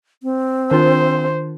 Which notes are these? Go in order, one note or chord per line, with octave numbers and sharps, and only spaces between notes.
C4
D#3 D4 F4 C5